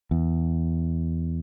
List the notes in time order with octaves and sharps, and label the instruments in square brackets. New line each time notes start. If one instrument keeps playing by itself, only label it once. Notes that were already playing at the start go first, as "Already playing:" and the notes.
[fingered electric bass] E2